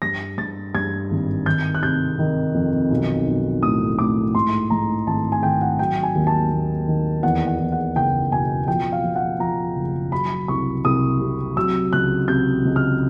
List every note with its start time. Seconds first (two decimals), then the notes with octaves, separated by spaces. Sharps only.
0.02 G2 A#6
0.37 G2 A6
0.74 G2 G#6
1.11 G#1
1.46 D#3 G6
1.75 F#6
1.83 C3 G6
2.19 D#3
2.54 F2
2.90 B1
3.26 B1
3.63 A2 D#6
3.99 A2 D6
4.35 G#2 C6
4.70 G#2 A#5
5.06 G#1 A5
5.32 G#5
5.43 D#3 G5
5.62 F#5
5.79 F#3 G5
6.03 G#5
6.15 D#2
6.27 A5
6.51 D#2
6.88 D#3
7.23 E2 F#5
7.47 F#5
7.59 E2
7.72 F#5
7.95 F#1 G5
8.31 B2 G#5
8.68 F3 G5
8.92 F5
9.04 F3
9.16 F#5
9.40 F3 A#5
9.76 F#1
10.12 F#3 B5
10.48 C2 C#6
10.85 C2 D#6
11.21 C3
11.56 F#3 E6
11.93 C#2 F#6
12.28 C3 G6
12.65 C#2
12.76 F6